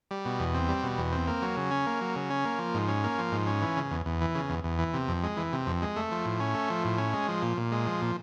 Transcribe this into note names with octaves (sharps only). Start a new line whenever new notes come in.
G3
B2
E2
C4
G3
B2
E2
C4
A#3
F#3
C#3
C#4
A#3
F#3
C#3
C#4
A#3
F3
G#2
C#4
A#3
F3
G#2
C#4
E3
C#3
E2
E2
E3
C#3
E2
E2
E3
C3
F2
G#3
E3
C3
F2
G#3
A3
F3
A2
C#4
A3
F3
A2
C#4
G#3
F3
A#2
A#2
G#3
F3
A#2